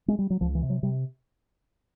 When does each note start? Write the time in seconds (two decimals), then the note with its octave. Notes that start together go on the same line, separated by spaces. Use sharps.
0.08 G#3
0.19 G3
0.30 F#3
0.41 C#2 F3
0.55 E3
0.63 C3
0.70 F#3
0.83 C3 G3